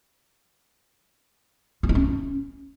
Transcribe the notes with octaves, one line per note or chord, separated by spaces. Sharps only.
F4
E4
C#4